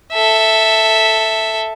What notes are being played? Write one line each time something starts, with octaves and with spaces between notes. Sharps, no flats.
A4 E5